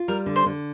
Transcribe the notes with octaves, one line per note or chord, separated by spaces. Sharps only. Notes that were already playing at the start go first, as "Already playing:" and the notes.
Already playing: F4
G3 A#4
D3
C5
D3